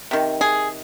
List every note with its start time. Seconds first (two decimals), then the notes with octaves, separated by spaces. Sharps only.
0.11 C3 D#3
0.41 G#4